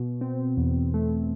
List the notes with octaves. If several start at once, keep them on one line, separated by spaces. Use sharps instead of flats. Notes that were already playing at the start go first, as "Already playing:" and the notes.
Already playing: B2
C4
E2
A3